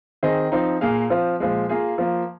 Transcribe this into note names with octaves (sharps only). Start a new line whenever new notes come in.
D#3 C4 G#4 D#5
F3 C4 D#4
A#2 A#3 G#4 F5
F3 C4 F4
A#2 F3 G#3
A#3 F4 G#4
F3 A#3 F4